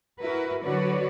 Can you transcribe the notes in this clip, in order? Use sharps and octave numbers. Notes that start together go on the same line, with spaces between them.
E4 F#4 A#4 B4
D3 F#3 F#4 B4 C#5 D5